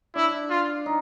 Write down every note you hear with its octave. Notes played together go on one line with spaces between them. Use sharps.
D4 E4
F4
D#4